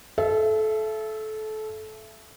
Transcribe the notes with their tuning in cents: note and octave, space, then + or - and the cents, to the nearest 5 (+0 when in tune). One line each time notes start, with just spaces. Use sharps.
A4 -25 E5 +25